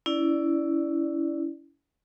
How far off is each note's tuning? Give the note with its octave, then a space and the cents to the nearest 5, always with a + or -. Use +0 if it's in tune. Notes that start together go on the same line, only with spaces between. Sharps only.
C#4 +35 E4 +0 D5 +0